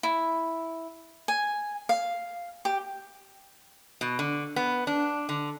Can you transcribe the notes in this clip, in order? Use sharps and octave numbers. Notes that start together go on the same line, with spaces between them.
E4
G#5
F5
G4
B2
D3
B3
D4
D3